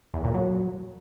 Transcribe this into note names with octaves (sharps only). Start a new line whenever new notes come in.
E2
A#2
F#3